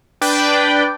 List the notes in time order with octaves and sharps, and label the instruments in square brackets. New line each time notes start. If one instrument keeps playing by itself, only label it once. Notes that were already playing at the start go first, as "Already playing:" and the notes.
[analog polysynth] D4 B4 D5 G5